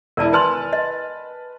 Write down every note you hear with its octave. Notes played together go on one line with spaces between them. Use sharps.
E1 E4 A#4 D5 A5
B4 G#5 A5 C6 F6
D#5